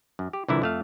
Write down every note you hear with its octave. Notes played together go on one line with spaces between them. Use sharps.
F#2
G4
C2 A#2 D3 E3 E4
F2 A3 F5